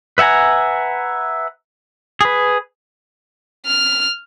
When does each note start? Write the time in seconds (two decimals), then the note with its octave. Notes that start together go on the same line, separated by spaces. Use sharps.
0.18 B4 E5 F#5 G#5 A#5
2.21 G#4 B4
3.66 F6